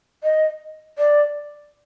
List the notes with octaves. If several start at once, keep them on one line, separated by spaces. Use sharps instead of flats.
D#5
D5